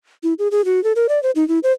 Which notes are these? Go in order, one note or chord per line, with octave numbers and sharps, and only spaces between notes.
E4
G#4
G#4
F#4
A4
A#4
D5
C5
D#4
E4
C5